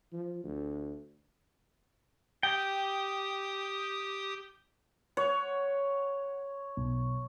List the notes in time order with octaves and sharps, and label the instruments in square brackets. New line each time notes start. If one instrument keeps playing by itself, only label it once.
[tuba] F3
D2
[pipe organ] G4 D#6 [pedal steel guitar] G5
[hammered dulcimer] C#5 [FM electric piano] F#5
[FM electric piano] B1